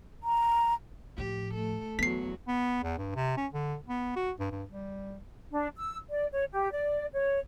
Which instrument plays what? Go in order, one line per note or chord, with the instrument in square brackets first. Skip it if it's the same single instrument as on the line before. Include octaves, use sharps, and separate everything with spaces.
[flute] A#5
[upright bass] A2 F3 [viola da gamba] G4
[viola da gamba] A3 A4
[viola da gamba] E2 F#3 [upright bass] B3 [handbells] B6 C7
[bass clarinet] B3
E2
G2
C3
C#4
D3
B3
F#4
G2
G2
G3
[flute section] D4
E6
D5
C#5
G4
D5
C#5